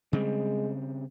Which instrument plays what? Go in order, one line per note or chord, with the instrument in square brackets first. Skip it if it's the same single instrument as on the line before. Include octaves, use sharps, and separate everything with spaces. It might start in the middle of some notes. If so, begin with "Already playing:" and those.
[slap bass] C#3 G3 C4 [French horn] G#3